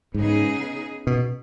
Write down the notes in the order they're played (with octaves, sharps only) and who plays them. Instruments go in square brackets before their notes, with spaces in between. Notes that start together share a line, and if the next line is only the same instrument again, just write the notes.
[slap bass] G#2 [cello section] C#3 B3 D#4 G#4
[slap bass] B2